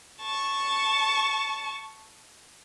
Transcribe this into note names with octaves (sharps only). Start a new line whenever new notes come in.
A5 C#6